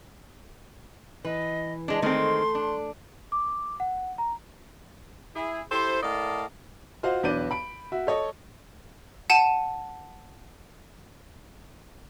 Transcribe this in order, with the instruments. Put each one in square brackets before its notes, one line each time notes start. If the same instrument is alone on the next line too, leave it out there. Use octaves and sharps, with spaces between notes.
[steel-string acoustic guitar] E3 [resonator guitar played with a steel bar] B4 [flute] D#5
[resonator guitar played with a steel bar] G#3 D4
[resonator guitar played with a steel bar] D#3 G#3 C4 [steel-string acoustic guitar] A3 [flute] C6
[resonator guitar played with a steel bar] D4
[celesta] D6
F#5
A#5
[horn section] E4 G#4
E4 G4 A4 C5
A2 A#4 D5 D#5 F5 A5
[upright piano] F4 F#4 C5 D#5 F5
B1 E2 D4 B4 G6 D#7
B5 D7
F#4 E5
A4 C#5 D#5
[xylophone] F#5 A5 D#7 E7